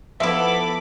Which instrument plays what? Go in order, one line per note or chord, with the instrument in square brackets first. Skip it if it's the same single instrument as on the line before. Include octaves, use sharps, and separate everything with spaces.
[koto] F3 E4 [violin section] B3 A4 [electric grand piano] E5 [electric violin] B5 D6